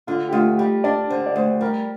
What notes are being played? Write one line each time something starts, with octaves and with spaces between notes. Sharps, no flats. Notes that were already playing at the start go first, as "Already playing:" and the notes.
D3 F4
G4
D2 F4
G3 G4
D4 D5
D3 C5
D5
D2 C5
G3 A#4